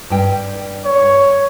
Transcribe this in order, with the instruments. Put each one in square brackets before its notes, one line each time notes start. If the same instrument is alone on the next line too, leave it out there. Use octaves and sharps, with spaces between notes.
[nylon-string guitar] G2 G5
[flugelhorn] C#5